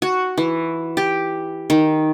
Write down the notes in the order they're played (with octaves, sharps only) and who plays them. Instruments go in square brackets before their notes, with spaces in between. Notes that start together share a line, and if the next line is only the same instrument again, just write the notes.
[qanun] F#4
E3
G4
D#3